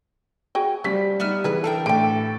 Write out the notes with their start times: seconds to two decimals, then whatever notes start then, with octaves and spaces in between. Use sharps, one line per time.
0.55 F#4 G#4 G5
0.84 F3 G3 C#4 B6
1.20 G3 B3 D#4 E5 F6
1.44 E3 G#4 B4
1.64 D4 A4 A#4 G5
1.86 A2 D3 E3 G4 A4 G5 D7